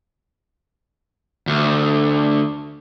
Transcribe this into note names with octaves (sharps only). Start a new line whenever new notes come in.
D2